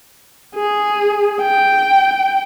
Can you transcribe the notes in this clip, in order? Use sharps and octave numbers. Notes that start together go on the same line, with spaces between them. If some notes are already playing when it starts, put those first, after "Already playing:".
G#4
G5